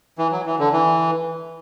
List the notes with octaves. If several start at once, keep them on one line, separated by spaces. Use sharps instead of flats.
E3
F#3
E3
D3
E3